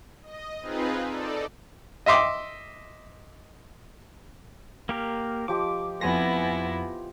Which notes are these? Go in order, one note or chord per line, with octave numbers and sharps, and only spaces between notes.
D#5
C4 D#4 F4 G#4 B4
D#4 A4 D5
D#5 E5 C6 D6
A#3 G4 A#4
F3 G4 D#5 D6
F2 B3 E4 G#5 C6 A#6